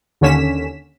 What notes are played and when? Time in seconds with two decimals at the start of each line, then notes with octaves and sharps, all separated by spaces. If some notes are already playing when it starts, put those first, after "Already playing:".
0.21 D#2 D3 C#4 B6 E7